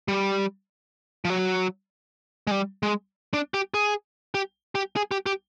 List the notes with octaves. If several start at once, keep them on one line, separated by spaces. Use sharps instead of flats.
G3
F3
F#3
G#3
G3
G#3
D4
G4
G#4
G4
G4
G#4
G4
G4